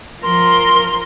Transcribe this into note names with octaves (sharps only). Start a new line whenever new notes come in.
F3 A#4 C6